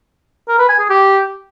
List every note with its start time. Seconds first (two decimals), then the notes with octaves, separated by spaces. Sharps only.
0.48 A#4
0.58 B4
0.69 G#5
0.79 G#4
0.89 G4